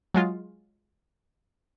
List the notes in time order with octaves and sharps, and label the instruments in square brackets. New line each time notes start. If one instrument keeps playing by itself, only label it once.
[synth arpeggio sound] F#3 G#3 F4